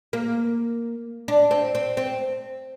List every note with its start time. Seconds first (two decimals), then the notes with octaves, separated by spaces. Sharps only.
0.13 A#3
1.28 D4
1.51 C4
1.75 C4
1.97 C4